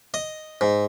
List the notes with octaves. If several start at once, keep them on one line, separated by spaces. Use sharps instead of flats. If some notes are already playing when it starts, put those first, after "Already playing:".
D#5
G#2